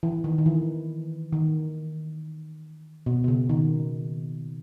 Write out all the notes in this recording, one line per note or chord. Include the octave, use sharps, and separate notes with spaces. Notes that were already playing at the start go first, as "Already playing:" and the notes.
E3
D#3
D#3
E3
D#3
B2
B2
C#3
D#3